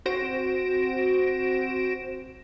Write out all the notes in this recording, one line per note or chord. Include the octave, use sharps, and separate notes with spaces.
C4 F#4 C5 A#6 D7 E7